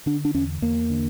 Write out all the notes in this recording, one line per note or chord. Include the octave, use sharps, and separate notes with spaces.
D3 D4
D4
E2 C#4
E2 A#3
D3